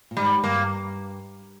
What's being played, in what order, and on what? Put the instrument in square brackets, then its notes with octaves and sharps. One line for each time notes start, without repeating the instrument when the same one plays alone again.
[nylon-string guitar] A#2
[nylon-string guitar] G#2 [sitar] G3
[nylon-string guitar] G2 [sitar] A#3